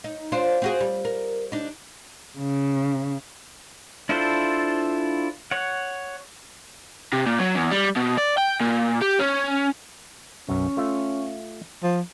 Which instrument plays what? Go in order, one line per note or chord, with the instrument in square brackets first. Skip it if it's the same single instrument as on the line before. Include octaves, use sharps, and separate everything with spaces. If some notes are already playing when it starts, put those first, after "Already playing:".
[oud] D#4
D4 F4 C5
C4 F#4 G#4
G3
A#4
D4 D#4
[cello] C#3
[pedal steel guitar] D4 E4 F4 A4 C5
C#5 F#5
[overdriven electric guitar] C3
A#2
F#3
E2
G3
B2
D5
G5
A#2
G4
C#4
[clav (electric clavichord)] B1 F#2 [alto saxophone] C#4
[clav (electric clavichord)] A3 F4 E5
[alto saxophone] F3